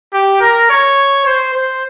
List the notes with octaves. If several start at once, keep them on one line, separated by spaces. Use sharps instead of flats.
G4
A#4
C#5
C5
C5